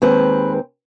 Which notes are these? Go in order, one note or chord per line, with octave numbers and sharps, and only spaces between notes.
D#2 D#3 G#3 C4 B4